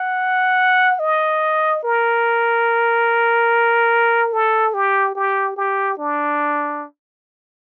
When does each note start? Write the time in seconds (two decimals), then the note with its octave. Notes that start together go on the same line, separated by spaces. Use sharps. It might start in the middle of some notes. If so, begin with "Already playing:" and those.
Already playing: F#5
1.00 D#5
1.83 A#4
4.33 A4
4.74 G4
5.15 G4
5.57 G4
5.98 D4